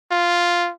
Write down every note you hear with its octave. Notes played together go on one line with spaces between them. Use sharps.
F4